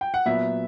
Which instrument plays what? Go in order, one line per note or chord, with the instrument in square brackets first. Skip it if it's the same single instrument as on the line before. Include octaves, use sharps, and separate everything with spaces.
[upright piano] G5
F#5
A#2 F#3 B3 E5